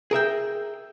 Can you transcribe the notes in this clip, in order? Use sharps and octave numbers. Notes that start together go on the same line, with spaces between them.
G#4 A#4 E5 G5